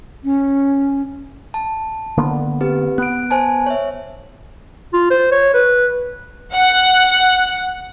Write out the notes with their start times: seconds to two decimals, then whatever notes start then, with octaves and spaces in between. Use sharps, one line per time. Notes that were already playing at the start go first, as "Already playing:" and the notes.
0.24 C#4
1.54 A5
2.17 D3 A#3 B3
2.61 C4 G4 B4
2.98 B3 F#6 D7
3.30 C5 G#5 A5
3.66 C#5 E5
4.94 F4
5.11 C5
5.32 C#5
5.54 B4
6.54 F#5